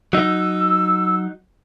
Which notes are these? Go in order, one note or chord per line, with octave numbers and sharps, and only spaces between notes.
F#3 D#4 E6